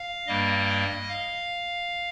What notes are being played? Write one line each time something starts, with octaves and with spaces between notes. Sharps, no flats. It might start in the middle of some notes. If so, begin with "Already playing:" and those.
Already playing: F5
G2 G3 A#3 D#5
F5